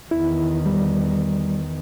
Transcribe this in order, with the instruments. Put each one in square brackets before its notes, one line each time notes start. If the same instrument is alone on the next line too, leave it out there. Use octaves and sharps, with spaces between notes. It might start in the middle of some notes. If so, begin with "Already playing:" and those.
[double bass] E2 D#3 [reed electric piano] E4
[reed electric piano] G3